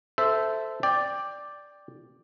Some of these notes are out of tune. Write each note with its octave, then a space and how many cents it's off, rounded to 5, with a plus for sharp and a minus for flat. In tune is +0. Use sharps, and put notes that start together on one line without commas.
A4 +0 C5 -15 E5 +0
D5 +0 G5 +10